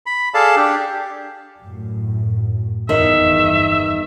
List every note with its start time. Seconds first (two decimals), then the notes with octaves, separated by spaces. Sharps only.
0.06 B5
0.34 G#4 A4 D5 F5 A5
0.56 D4 G4
1.61 F#2 A2
2.89 G1 E2 D#3 E5